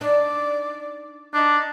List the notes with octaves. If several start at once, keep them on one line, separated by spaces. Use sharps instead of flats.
D4 D#4 D5
D4 D#4